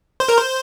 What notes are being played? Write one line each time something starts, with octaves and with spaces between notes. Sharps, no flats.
C5
A#4
C5